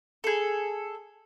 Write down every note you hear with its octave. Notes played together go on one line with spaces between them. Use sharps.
G#4 A4